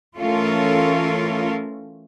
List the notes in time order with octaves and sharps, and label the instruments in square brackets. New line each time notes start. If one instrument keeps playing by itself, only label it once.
[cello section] E3 A3 C#4 F4 A4 A#4